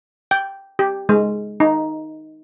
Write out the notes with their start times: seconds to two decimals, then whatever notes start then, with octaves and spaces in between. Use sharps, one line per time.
0.31 G5
0.79 G4
1.09 G#3
1.60 D#4